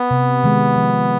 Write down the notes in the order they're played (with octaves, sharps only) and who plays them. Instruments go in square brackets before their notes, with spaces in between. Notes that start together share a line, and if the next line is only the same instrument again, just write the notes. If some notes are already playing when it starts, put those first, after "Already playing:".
Already playing: [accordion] B3
[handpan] C3
D#3 G#3
F3